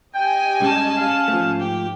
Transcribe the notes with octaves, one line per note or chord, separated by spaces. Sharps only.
G4 D#5 G5 G#5
G#2 G3 C#4 A5
F5
G#2 F3 A3
G4